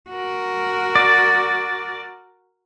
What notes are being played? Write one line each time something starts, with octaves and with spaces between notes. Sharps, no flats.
F#4 A#4
D5